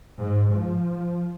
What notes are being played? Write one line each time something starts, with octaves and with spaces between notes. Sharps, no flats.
G#2
F3